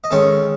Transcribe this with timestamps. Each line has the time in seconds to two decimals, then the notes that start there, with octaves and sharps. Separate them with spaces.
0.04 D#5
0.11 D#3 G#3 C#4 A4 C#5